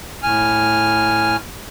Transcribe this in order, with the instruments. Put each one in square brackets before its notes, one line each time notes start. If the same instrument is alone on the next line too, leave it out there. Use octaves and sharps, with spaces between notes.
[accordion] A2 G#5 F6